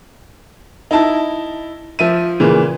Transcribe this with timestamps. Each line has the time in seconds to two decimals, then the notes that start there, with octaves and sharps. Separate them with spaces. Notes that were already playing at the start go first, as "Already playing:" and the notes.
0.91 D#4 E4 A5
1.99 F3 E5 D#7
2.40 A#2 C#3 E3